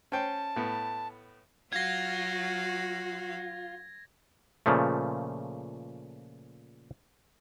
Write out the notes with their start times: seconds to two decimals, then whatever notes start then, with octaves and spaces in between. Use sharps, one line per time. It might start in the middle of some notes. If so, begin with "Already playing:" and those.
0.12 C#4 C5 G5 A5
0.56 A2 B3
1.73 F#3 F4 F#4 F5 G#6 A#6
4.66 A#2 C#3 F3 A3